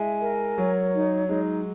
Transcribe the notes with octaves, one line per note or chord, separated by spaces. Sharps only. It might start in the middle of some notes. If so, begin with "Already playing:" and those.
Already playing: G#3 E4 E5 G#5
A#4
F#3 C#5
D#4
G#3 D#4